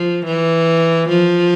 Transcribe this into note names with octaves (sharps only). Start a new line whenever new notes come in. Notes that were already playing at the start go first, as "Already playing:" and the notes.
Already playing: F3
E3
F3